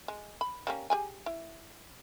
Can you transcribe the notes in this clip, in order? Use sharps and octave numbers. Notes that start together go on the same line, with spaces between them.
G#3
B5
G3 A#3 C#4
G4 G#4 G#5
E4